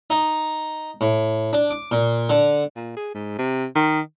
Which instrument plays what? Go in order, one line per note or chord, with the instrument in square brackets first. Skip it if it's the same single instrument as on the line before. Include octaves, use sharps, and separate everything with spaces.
[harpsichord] D#4
A2
D4
D6
A#2
D3
[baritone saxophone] A#2
G#4
G#2
C3
D#3